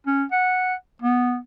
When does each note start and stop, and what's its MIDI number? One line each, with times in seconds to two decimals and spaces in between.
0.07 0.24 61
0.32 0.74 78
1.02 1.37 59